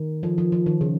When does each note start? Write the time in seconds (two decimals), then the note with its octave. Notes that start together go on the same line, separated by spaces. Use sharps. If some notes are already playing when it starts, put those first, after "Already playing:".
Already playing: D#3
0.23 F3
0.38 F3
0.52 F3
0.66 D#3
0.81 C#3